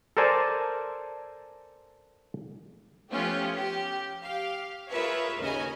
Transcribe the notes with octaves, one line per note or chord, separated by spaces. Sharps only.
A4 A#4 C5 D5 G#5 A5
F3 A3 B3 C#4 F4 G4
G4
G4 F5
F4 G#4 A#4 B4 C#5 E5
D#2 C#3 C#4 D#5 G#5 A#5